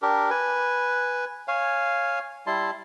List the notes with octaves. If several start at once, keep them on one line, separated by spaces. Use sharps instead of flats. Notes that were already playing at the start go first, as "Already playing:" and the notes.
D4 G4 A#4
B4 G#5
C#5 F5 G#5
G3 E4 A5 C6